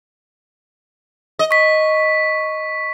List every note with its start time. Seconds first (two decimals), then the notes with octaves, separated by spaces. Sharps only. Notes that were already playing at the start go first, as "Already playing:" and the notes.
1.39 D#5
1.51 C#6 B6